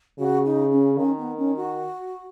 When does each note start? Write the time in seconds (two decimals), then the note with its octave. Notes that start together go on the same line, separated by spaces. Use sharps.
0.19 C#3 F#4
0.45 D#4
0.72 C#4
0.98 D#3 C#4
1.18 B3
1.38 C#4
1.57 F#4